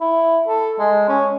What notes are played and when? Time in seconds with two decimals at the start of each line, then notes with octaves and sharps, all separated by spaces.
0.01 E4
0.48 A4
0.79 G#3
1.09 C#4